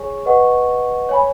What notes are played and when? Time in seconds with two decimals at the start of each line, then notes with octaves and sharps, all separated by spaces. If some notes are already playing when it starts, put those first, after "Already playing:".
Already playing: G#4 C#5 G#5 C#6
0.25 B4 D#5 F#5 C#6
1.09 C#5 G#5 B5